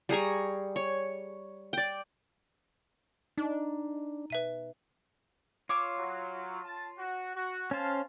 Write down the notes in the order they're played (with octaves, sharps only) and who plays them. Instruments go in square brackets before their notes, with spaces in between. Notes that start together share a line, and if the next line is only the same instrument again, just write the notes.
[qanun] G3 G#4 A#5 C#6
C#5
D5 G5
[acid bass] D4 [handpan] D#4
[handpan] B2 [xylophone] B4 E5 D#7
[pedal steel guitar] F4 [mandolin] C#5 D6 E6
[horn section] F#3
A5
F#4
F#4
[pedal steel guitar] C#4 C5 [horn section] F5 A5